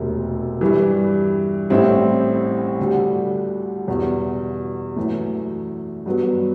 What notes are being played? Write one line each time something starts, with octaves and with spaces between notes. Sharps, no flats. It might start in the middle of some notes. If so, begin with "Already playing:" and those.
Already playing: E1 D2 C3
G2 E3 G3
A1 A2 G3 C4 E4
D2 D3 G3
E2 B2 G3 B3 F#4
F#2 E3 A3
G2 F#3 B3